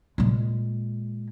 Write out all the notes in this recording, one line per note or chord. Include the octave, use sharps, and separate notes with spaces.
A#2 G#3